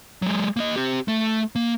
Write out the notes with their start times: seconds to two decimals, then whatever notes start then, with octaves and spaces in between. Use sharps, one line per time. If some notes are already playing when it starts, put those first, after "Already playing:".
0.22 F#3 G#3
0.57 A#3 D#5
0.76 C4 G4
1.08 A3
1.56 A#3